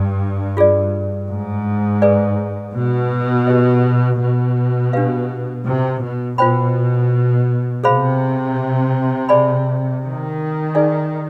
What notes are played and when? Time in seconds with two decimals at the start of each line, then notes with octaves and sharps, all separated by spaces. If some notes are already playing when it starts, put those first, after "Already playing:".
Already playing: G2
0.57 F4 G#4 D5
1.30 G#2
2.02 G#4 B4 D5 G#5
2.75 B2
3.47 G4 B4 D#5
4.20 B2
4.93 D4 G4 B4 F5
5.65 C3
6.02 B2
6.38 B2 F4 C5 G5 B5
7.84 C3 G#4 C5 F5 B5
9.29 G#4 D5 G#5 B5
10.03 D#3
10.75 D#4 G#4 D5 G#5